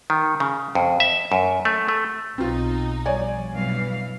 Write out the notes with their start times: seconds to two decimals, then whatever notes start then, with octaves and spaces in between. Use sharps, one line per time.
0.10 D#3
0.40 C#3
0.75 F2
1.00 E5
1.32 F#2
1.65 A3
1.88 A3
2.38 B1 C4 D#4 F4
3.06 F3 G3 C#5 D5 G#5
3.52 G2 B2 E3 F#3 F5